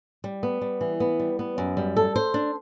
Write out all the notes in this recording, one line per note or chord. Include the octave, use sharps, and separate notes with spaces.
G3
B3
G3
E3
B3
G3
B3
F#2
G3
A4
C5
D4